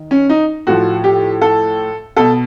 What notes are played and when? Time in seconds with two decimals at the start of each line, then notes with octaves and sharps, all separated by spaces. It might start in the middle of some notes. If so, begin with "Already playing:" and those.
Already playing: D#3
0.11 C#4
0.29 D#4
0.67 A2 F3 F#4
1.04 G4
1.41 A4
2.16 B2 A4